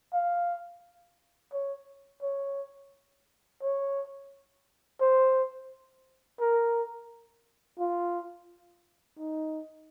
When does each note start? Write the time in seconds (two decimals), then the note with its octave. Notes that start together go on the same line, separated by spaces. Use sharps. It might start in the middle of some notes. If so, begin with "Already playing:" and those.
0.14 F5
1.53 C#5
2.22 C#5
3.62 C#5
5.01 C5
6.40 A#4
7.79 F4
9.19 D#4